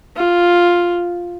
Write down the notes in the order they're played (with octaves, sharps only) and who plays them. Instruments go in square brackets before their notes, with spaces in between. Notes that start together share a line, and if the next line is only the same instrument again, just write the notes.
[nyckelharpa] F4